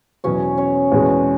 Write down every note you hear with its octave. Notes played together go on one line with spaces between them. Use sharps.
E2 B2 F#3 C#4 C#5
C#4 C#5
E2 B2 G#3